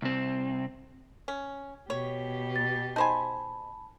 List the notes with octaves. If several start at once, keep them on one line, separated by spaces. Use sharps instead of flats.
C2 C4
C#4
B2 G4 C#5
A6
D#4 C5 G#5 A5 B5